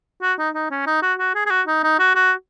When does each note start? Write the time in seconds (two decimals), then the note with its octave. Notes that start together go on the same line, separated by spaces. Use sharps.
0.22 F#4
0.38 D#4
0.54 D#4
0.71 C#4
0.87 D#4
1.02 F#4
1.19 F#4
1.35 G#4
1.46 G#4
1.50 F#4
1.67 D#4
1.83 D#4
1.99 F#4
2.15 F#4